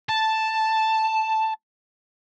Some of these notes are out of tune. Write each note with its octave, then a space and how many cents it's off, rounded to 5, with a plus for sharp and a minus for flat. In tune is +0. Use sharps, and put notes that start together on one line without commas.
A5 +0